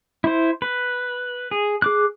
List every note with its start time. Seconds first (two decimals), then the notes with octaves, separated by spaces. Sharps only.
0.24 E4 C5
0.62 B4
1.51 G#4
1.82 G#4 D6 F#6